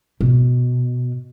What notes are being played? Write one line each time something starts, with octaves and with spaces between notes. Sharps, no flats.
B2